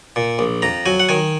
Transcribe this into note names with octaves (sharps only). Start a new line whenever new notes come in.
A#2
A#1
F2 A#5
F#3 G#5
F#5
D#3 G#5